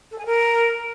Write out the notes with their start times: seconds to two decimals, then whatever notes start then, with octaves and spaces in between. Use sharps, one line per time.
0.11 A4
0.18 G#5
0.26 A#4